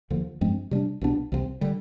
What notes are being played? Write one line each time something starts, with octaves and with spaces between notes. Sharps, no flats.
D#2 D3 F3
G2 F3 G#3 C4
C3 G3 D4
C2 B2 B3 D4
C2 C3 F3 C4
D3 G3